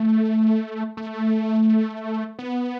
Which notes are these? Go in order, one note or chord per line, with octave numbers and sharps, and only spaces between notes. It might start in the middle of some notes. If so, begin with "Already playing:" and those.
Already playing: A3
A3
B3